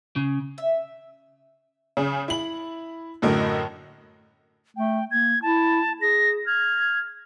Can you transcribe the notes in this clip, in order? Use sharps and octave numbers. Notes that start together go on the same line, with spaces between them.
C#3
E5
C#3 G#4
E4 F#7
F#2 A2 D3 A3 A#4 D#5
A3 G5
A#3 G#6
E4 A5
G#4 A#6
F6 G#6